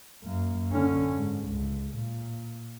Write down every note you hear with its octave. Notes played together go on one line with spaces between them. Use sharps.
F#2 A#3
D3 C#4
G#2
C#2
A#2